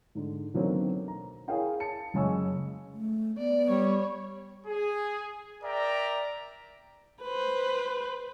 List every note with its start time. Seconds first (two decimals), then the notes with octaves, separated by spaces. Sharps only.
0.15 G#2 D3
0.54 B2 D3 D#3 F#3 A#3 C4
1.08 A#5
1.48 E4 G#4 A#4 C#5 F5 G5
1.80 A5 C#7
2.14 F#1 C#3 G#3 G#5 C#6 E6
2.94 A3
3.38 B3 D5
3.70 G3 C#5
4.67 G#4
5.63 A#4 D5 E5 G5 A#5
7.23 B4 C5